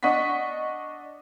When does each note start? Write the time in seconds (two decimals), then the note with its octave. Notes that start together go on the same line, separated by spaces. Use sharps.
0.03 D4 D#5 F#5 C#6 B6